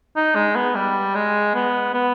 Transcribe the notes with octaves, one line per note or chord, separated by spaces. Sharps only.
D#4
G#3
B3
G3
G#3
B3
B3